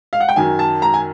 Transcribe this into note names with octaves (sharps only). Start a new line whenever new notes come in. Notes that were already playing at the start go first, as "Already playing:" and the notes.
F5
F#5
G5
F#2 D#3 F#3 G#5
A5
A#5
G#5